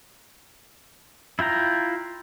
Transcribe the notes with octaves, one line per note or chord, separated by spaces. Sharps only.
E4 F4 G5 A#5